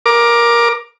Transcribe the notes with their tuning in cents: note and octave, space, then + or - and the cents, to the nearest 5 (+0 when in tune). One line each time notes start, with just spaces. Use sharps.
A#4 +15 D6 +10